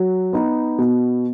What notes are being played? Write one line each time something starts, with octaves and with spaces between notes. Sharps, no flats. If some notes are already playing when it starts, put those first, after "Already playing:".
Already playing: F#3
B3 D#4
B2